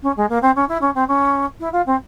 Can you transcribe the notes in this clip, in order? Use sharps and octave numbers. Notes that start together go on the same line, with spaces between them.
C#4
G#3
A#3
C4
C#4
E4
C#4
C4
C#4
E4
F4
C4